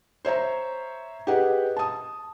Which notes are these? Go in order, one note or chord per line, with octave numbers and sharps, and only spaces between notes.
C5 C#5 E5 A#5
G4 G#4 B4 D#5 F#5 G5
A5 D#6